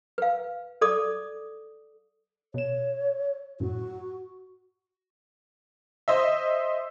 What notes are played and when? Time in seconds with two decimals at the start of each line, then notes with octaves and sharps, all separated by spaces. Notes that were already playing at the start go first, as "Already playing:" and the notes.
0.18 B4 F5
0.81 A4 D5 D6 D#6
2.54 B2 C#5 E7
3.60 F#2 A2 F#4
6.08 C5 D#5 E5